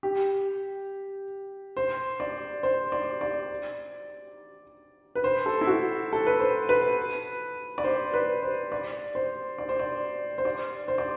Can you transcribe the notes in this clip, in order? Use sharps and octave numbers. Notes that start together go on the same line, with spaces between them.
G4
C5
D5
C5
D5
D5
B4
C5
A4
E4
F#4
A4
B4
C5
B4
D5
C5
B4
C5
D5
C5
D5
C5
D5
C5
D5
C5
D5